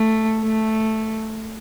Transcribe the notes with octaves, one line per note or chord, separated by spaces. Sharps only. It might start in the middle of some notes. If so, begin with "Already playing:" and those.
Already playing: A3
A3